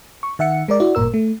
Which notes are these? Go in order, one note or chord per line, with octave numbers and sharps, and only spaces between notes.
C#6
D#3 E5 F#5 C#7
G#3 A#4 D5
E4 F#4 D5
G#1 G2 A#2 A#4 E6
A3